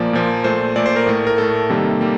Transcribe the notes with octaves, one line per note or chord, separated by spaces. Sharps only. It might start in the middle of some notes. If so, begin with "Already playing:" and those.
Already playing: A#2 F3 A#3 D5
A#2 F3 A#3
A#2 A3 C5
A#2 A3 D5
C5
A#4
A2 A3
A#4
A2 A3 A4
C3 D#3 G3 A#3
G3 A#3